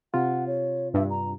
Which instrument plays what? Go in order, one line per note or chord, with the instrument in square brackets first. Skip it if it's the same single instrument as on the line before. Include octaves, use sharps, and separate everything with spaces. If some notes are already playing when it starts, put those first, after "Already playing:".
[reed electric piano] C3 F4 [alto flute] F#5
[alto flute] C#5
[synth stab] G2 [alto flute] E5
[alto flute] A#5